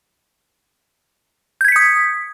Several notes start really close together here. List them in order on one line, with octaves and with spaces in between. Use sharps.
G6 G#6 B6 C#7 D#6